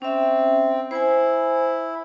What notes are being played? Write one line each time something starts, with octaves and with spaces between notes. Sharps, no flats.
C4 C#4 E5
E4 C5 G#5